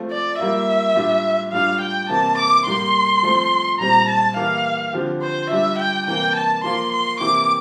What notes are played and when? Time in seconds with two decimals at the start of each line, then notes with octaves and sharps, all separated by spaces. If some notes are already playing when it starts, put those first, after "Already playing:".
Already playing: F3 A3 C4 F4
0.11 D5
0.39 G3 A#3 F4 E5
0.95 A2 G3 D4 F4
1.52 A2 G3 D4 F4 F5
1.81 G5
2.09 C3 E3 A#3 A5
2.38 D6
2.66 A2 G3 A#3 C6
3.23 F3 A3 C4
3.79 A#2 G3 C4 A#5
4.08 A5
4.36 E3 A#3 E4 G4 F5
4.93 D3 F3 C4 G4
5.22 C5
5.50 G3 D4 F4 E5
5.78 G5
6.07 C3 E3 A#3 G5
6.35 A5
6.64 F3 A#3 F4 C6
6.92 C6
7.20 C3 E3 A#3 E4 G4 D6